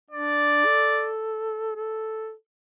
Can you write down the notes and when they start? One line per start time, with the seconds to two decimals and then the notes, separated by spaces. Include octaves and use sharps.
0.10 D4 D5
0.66 A4
1.75 A4